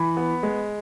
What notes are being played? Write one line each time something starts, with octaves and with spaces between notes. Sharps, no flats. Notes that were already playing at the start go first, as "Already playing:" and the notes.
Already playing: E3 B5
B3
G#3